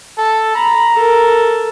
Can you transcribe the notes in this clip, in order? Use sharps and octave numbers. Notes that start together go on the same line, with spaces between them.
A4
A#5 B5
A4 A#4